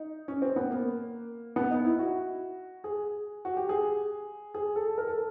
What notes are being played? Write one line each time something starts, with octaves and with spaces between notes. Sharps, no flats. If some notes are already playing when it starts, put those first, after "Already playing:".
Already playing: D#4
C#4
C4
B3
A#3
B3
D#4
E4
F#4
G#4
F#4
G4
G#4
G#4
A4
A#4
A4